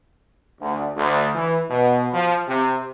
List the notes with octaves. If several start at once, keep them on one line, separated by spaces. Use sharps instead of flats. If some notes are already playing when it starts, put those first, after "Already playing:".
D2
D2
E3
B2
F3
C3